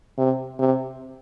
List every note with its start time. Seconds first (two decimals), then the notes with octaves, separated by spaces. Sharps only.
0.18 C3
0.59 C3